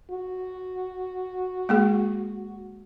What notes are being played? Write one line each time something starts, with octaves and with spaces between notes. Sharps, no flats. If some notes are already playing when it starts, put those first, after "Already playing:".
F#4
G#3 A#3 G#4